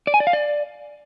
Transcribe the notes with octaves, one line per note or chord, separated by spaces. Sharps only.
D5
G#5
D5
F5
D5